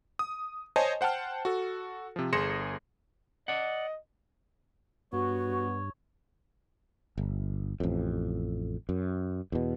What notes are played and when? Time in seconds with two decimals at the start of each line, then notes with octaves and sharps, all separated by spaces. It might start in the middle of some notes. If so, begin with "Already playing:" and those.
0.19 D#6
0.76 C5 C#5 D#5 G#5 A5
1.01 C5 F#5 G5 A5 F6
1.45 F#4 A4
2.16 C3 F3
2.33 G1 G#4 C6 A#6 C#7 E7
3.48 D5 D#5 F#5
5.13 G2 B3 F#4 C#5
7.18 G1
7.80 A1 F2
8.89 F#2
9.52 E2 B2